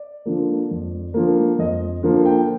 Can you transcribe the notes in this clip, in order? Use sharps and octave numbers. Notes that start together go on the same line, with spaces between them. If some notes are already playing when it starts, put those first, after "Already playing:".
Already playing: D5
D3 F3 A#3
F2
D3 F3 A#3
F2 D#5
D3 F3 A#3
G5